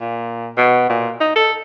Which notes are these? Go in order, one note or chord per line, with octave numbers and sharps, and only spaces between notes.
A#2
B2
A#2
D#4
A4